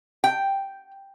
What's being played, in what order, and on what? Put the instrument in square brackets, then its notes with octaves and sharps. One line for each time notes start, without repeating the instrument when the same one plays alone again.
[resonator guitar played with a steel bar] G5